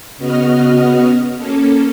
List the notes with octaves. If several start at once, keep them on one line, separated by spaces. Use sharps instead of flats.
C#3 B3 F#4 D#5 F6
A#3 C#4 A4